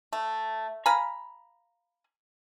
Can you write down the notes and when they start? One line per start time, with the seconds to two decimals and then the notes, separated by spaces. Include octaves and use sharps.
0.13 A3
0.86 F5 G#5 A#5 B5